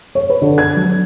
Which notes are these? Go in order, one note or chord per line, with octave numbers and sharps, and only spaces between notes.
C#5
B4
D3
G#6
F#3